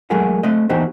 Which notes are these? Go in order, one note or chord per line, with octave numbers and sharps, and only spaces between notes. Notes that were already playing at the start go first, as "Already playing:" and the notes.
F#3 G#3 A3 G#4 A#4 F#5
A3 C4 D#5
E3 B3 D#4 F#4 G4 C5